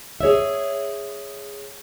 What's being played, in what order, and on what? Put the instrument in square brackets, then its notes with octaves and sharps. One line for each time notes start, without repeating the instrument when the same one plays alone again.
[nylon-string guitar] G#4 C#5 D#5 E5